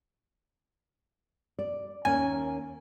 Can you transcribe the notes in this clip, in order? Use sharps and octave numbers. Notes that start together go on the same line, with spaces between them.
D5
D#2 A#3 C#4 G#5